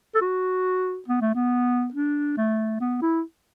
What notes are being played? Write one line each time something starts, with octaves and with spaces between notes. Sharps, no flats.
A4
F#4
B3
A3
B3
D4
A3
B3
E4